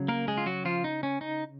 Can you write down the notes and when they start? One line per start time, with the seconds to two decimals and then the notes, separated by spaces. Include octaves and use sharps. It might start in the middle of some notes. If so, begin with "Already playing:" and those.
Already playing: C#3 F#3
0.08 A#3 A#4
0.28 G#3 G#4
0.38 F4
0.46 F#3 F#4
0.65 F3 F4
0.84 D#4
1.03 C#4
1.21 D#4